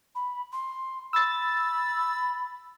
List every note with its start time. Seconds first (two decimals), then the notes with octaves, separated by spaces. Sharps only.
0.15 B5
0.53 C6
1.13 B5 E6 A6